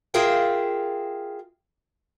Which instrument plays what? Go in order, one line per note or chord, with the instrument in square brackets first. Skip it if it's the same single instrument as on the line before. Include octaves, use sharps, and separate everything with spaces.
[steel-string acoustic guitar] F4 G#4 A#4 E5 F5 G5